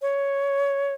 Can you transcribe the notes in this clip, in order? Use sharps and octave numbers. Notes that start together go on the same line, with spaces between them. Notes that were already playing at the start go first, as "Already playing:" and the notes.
C#5